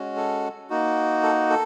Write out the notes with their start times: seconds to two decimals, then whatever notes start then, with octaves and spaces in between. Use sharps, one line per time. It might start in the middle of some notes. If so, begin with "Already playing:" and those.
Already playing: G#3 C#4 F#4
0.16 A4
0.70 A#3 D#4 F#4
1.23 A4
1.50 A4